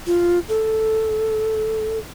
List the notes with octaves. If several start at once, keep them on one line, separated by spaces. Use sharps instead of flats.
F4
A4